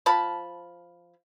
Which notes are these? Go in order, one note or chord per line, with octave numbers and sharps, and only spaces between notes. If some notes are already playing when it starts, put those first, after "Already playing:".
F3 A5 B5